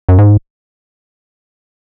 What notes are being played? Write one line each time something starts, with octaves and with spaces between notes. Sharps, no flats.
F#2
G#2